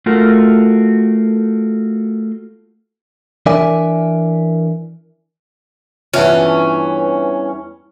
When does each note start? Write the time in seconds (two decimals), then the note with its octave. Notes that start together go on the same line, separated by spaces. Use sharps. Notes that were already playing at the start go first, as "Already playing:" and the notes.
0.06 A3 F4 F#4 A4 A#4
3.46 E3 D4 A#4 D5 E5 G#5
6.14 E2 G2 E3 C#4 F4 E5